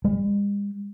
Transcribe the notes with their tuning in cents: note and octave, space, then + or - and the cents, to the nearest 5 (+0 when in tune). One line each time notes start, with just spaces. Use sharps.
G#3 -45